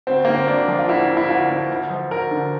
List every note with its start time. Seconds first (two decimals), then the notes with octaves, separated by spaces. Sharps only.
0.07 D2 C4
0.25 D3 A#3
0.36 C4
0.48 D2 D4
0.68 F3
0.79 F4
0.89 D2 E4
1.09 D2
1.17 E4
1.29 D2 F4
1.50 D2
1.70 D2
1.90 F3
2.11 D2 A#4
2.31 D3